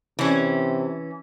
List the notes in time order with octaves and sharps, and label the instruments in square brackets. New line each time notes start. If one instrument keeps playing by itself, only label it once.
[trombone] C3 [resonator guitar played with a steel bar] E3 C#4